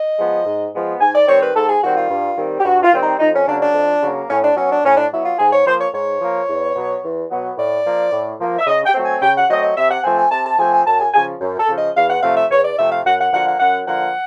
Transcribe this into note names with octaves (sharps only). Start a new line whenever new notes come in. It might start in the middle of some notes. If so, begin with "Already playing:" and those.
Already playing: D#5
F3 G#3 B3
G#2
F3 G#3 B3
G#2 G#5
D5
D#3 G3 C4 C#5
B4
G#2 A4
G#4
D#3 G3 C4 F#4
F4
G2
D#3 G3 C4
G4
G2 F#4
F4
D#3 G3 C4
D#4
F2 D#4
C#4
C#3 F#3 A#3 D4
D4
F2
C#3 F#3 A#3
A2 C#4
D4
F#3 B3 C#4
D4
A2 C#4
D4
F#3 B3 E4
F4
G#2 G#4
C#5
F3 A#3 C5
C#5
G#2 C#5
F3 A#3
E2
B2 F#3 B3
E2
B2 F#3 B3
A2 D5
F3 A#3
A2
F3 A#3
E5
C#3 D#5
G5
F#3 A3 C4
G#5
C#3 G5
F#5
F#3 A3 C4 D#5
D#5
C3 E5
F#5
F3 A3 C4 G#5
G#5
C3 A5
A5
F3 A3 C4 G#5
G#5
F#2 A5
G#5
C#3 F3 G#5
F#2
A4
C#3 F3
D#5
E2 F5
F#5
C3 F3 A3 C4 F5
E5
E2 C#5
D5
C3 F3 A3 C4 E5
F5
F#2 F#5
F#5
D3 F3 A#3 F#5
F#5
F#2 F#5
D3 F3 A#3 F#5